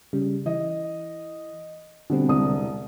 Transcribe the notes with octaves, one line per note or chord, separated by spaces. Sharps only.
C#3 G3
E3 D#5
B2 D3 G3 C4
E1 C2 D#6